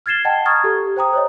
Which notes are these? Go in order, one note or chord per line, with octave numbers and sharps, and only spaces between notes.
F6 G#6 A6 C7 E7 G7
D#5 F#5 G5 A5
A#5 C#6 D#6 F6 G#6 A6
G4 A4
C5 G5 A#5 D#6
C5 C#5 D#5